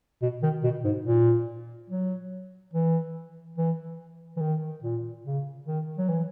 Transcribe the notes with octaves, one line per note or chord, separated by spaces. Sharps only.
B2
D#3
B2
G#2
A#2
F#3
E3
E3
E3
D#3
A#2
C#3
D#3
F#3
E3